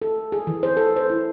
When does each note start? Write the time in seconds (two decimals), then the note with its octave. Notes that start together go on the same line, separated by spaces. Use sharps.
0.02 A4
0.32 G#4
0.47 E3
0.63 C5
0.77 A4
0.96 C5
1.10 E4